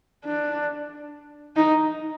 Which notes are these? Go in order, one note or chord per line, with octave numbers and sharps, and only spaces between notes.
D4
D#4